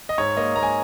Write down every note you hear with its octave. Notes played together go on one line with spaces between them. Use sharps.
D#5
G#2 C#5
A#3 D#5
A#3 A#5
G#5